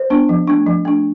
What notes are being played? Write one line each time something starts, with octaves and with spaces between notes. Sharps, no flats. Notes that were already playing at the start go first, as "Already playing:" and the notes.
Already playing: C5
B3 D4
F3
A3 D4
F3
A3 D4